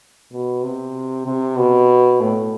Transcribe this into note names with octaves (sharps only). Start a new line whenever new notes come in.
B2
C3
C3
B2
A2